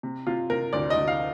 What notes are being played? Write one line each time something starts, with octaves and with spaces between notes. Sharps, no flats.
C3
C3 F4
C3 A#4
D2 D5
D#5
D2
F5